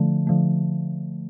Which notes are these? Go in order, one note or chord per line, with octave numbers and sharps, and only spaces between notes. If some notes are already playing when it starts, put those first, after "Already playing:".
Already playing: D3 F3 A3
D3 F3 A3